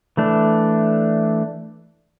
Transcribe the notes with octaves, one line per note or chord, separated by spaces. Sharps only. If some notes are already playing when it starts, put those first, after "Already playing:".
E3 A3 D4